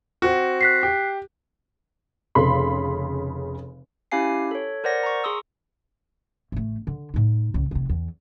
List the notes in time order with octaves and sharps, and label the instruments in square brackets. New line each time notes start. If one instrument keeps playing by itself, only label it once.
[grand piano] C4 F#4
[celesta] F#6 B6 C7
[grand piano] G4
[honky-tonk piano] F1 C#3 A4 B5 C6
[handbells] C#4 E4 G4 F5 G#5 C7
A4 C#5
A#4 C5 D5 F#5 A#6
A#5 C#6
G#4 C6 D#6 E6
[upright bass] A1 A3
D3
A2 D#4
C#2
F1 C3
E2